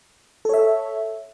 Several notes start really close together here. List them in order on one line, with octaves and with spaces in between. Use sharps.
A4 C#5 E5